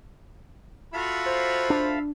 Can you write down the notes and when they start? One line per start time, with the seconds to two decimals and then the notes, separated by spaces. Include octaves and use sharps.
0.94 F4 F#4 A4 E5 F5 B5
1.26 C5
1.70 D4